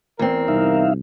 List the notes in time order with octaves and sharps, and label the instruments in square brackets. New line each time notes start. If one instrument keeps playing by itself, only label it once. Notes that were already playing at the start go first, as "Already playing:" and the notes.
[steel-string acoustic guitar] E2 C4 [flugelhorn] A#4
[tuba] C2 [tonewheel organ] D#4 E5 F5